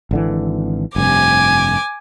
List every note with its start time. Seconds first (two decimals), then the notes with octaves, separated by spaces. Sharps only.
0.11 G#1 D3 E3
0.96 F1 G2 C3 G#5 D6